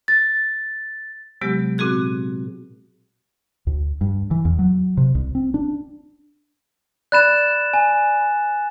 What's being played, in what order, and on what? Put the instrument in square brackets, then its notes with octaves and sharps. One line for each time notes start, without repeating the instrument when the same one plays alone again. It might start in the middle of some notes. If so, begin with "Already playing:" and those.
[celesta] A6
[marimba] C3 F#3 G#3 B3 G4
A#2 C4 F#4 G#4 F#6
[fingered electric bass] D2
G2
E3
E2
F#3
C3
C2
C4
D4
[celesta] D5 B5 [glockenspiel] F#6 A6 E7
[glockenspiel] G#5